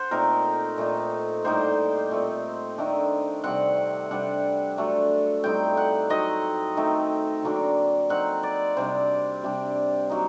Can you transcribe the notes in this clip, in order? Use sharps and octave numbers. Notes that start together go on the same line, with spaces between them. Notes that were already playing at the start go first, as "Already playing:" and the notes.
Already playing: C5 F#5
A#2 A3 C4 D#4 A#4
A#2 A3 D#4
A2 G3 A#3 D#4 C5
A#2 A3 C4
D#3 A3 D4
C3 G3 C4 F#5
C3 G3 D4 F#5
F#3 A3 D4
A2 G3 C4 D#4 G5
F#5
F#3 C4 D#4 D#5
D#3 A3 C4 D#4
D3 F#3 A#3 D4
F#3 C4 D#4 F#5
D5
C3 G3 D4 C5
C3 G3 D4
F#3 A#3 D#4